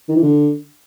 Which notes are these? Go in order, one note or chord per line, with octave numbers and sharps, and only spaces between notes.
D#3
E3
D3